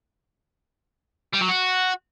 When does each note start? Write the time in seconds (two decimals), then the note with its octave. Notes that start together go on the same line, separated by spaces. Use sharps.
1.34 G3
1.42 F#3
1.49 F#4